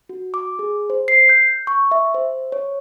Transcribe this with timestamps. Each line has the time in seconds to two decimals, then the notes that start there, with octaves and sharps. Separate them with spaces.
0.09 F#4
0.34 D6
0.59 G#4
0.90 C5
1.08 C7
1.29 G6
1.67 C#6
1.91 E5
2.14 C5
2.52 C#5